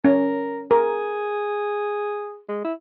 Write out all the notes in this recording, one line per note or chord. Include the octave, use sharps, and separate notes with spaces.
C#4 A#4
G#4 A#4
G#3
E4